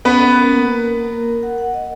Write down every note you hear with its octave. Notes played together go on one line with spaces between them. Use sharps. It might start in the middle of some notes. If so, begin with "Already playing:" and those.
B3 C#4 B4
C#4
A#4
A#3
A#4
A#4
A#3
A#4
A#4
F#5
F#5
D#5